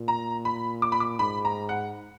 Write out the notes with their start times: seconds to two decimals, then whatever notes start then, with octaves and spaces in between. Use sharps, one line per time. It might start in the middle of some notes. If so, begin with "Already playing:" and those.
Already playing: A#2
0.08 A#5
0.45 B5
0.82 D6
0.92 B5
1.00 D6
1.19 G#2 B5
1.45 A#5
1.69 F#5